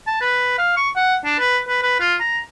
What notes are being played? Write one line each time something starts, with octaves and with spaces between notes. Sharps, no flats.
A5
B4
F5
C#6
F#5
D4
B4
B4
B4
F4
A#5